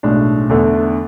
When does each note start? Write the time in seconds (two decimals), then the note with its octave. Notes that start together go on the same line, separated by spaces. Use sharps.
0.03 B1 A2 G#3 D4
0.49 E2 D3 A3